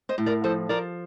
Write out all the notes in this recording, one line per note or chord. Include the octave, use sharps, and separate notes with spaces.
C5 D#5
A2
A#4 D5
F3 A4 C5
F3 A#4 D5